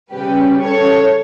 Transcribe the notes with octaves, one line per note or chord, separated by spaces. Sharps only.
C#3 G3 C#4 G4 B4
A4 C#5